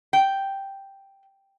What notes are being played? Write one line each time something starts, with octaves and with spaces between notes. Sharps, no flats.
G5